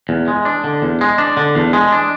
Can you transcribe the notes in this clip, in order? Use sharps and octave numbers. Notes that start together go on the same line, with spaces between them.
E2
G#3
D4
D3
E2
G#3
D4
D3
E2
G#3
D4